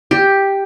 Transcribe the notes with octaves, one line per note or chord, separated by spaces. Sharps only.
G4